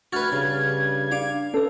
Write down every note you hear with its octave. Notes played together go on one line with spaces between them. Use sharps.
D2 F#4 B4 F6 G#6 A6
G2 C#3
D4 F5 D6
C#4 A4 B4